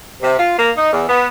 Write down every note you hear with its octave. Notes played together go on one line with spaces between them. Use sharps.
C3
F4
A#3
D#4
E2
B3